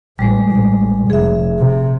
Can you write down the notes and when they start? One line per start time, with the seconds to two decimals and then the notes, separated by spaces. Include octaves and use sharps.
0.19 A1 G3 G#3
0.51 A1
1.10 F1 G#4 E5
1.59 C3